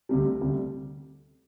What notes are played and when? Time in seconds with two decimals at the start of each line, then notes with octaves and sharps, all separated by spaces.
0.09 D2 C3 G3
0.41 D2 C3 G3